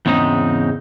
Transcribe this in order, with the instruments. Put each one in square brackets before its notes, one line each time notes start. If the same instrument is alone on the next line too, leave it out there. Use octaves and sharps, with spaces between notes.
[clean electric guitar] E2 G#2 C#3 G#3 C4 D#4